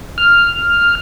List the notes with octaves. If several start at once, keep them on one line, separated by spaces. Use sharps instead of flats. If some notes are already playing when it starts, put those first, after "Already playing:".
F6